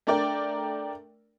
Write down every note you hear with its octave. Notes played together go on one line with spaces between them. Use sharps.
A3 D4 A#4 D5 G5